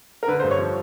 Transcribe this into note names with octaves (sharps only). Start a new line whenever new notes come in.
A#4
D3 B4
C5
G2
C#5
F3